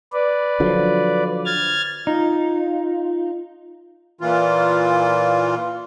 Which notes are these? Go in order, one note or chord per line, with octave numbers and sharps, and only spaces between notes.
B4 D5
D3 F3 F#3
F6 G#6 A6
D#4 F4
A#2 E3 F4